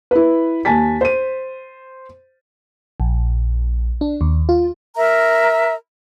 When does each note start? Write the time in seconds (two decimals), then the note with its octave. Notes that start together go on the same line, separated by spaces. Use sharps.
0.11 E4 B4
0.65 D#2 G#5 A5 A6 B6
1.01 C5 D#7
3.00 A#1
4.01 D4
4.21 D#2
4.49 F4
4.96 A#4 E5 A#5